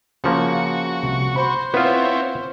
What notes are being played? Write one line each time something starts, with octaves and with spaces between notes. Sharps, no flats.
C#3 F3 A#3 F#4 C#6
C2
C5 B5
B3 C4 E4 F4 B4 C#5